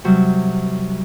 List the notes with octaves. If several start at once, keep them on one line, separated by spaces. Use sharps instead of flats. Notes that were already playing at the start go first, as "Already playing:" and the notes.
C3 F#3 G3